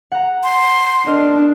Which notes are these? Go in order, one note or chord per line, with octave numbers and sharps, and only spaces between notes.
F#5 A#5
C6
D4 A#4 D#5 F6